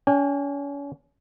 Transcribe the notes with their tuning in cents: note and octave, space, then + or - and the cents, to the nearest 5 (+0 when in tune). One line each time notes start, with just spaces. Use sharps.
C#4 +40 G#5 -40